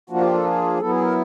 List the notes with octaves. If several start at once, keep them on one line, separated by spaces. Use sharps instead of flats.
F3 A#3 D4 F4 F#4
G4
A4
G#4
F#3 B3 E4 A4
G#4
A#4